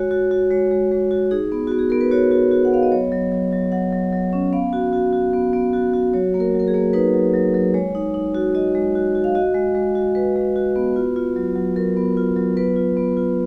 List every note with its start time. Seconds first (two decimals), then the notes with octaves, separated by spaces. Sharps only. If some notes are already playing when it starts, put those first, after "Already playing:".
Already playing: G#3 F#4 C#5
0.11 F#4
0.31 F#4
0.50 G#3 C#5
0.71 G#3
0.91 G#3
1.11 F#4
1.31 D#4 G#4
1.52 B3
1.67 B3 F#4
1.79 G#4
1.90 B3 A#4
2.01 B4
2.11 F#4 C#5
2.31 F#4
2.51 F#4
2.65 F#5
2.72 B3 F5
2.83 D#5
2.91 F#3 C#5
3.12 F#3
3.32 F#3
3.52 F#3
3.72 F#3 F#5
3.92 F#3
4.13 F#3
4.33 C#4
4.53 B3 F5
4.73 F#4
4.93 F#4
5.13 F#4
5.33 B3
5.53 B3
5.73 F#4
5.93 F#4
6.13 F#3 C#5
6.34 A#3
6.40 A#4
6.54 F#3
6.60 A#4
6.68 G#4
6.74 A#3
6.93 D#4 B4
7.14 F#3
7.34 F#3
7.54 F#3
7.74 G#3 C#5
7.95 D#4
8.14 D#4
8.35 F#4
8.55 F#4 D#5
8.75 G#3
8.95 F#4
9.15 F#4
9.24 F5
9.35 F#4 D#5
9.55 G#3
9.75 G#3
9.95 F#4
10.15 G#3 B4
10.36 G#3
10.56 F#4
10.76 B3
10.96 F4
11.16 F4
11.36 F#3
11.56 F#3
11.76 F#3 A#4
11.97 B3
12.17 F4
12.36 F#3
12.57 B3 B4
12.76 F4
12.97 B3
13.17 F4